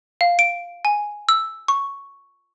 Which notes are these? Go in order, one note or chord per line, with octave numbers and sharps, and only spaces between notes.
F5
D7
G#5
E6
C#6